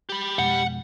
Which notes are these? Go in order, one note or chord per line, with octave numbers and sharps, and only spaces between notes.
G4 B5
F2 B2 G#3 F#5